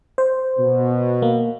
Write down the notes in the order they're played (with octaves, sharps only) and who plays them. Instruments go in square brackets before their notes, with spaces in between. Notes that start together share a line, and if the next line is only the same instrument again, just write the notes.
[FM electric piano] C5
[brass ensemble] B2
[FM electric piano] A#3